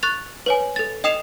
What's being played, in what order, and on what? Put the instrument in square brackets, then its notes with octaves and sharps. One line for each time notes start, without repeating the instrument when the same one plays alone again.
[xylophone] C#6 F#6 A6 F7
B4 C#5 G#5
A4 A6
D#5 G5 D#6 C7 E7 F7